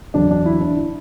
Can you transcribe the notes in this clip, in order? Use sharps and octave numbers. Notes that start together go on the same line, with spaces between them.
E2 D3 F#3 D4
D4
E4
D4
E4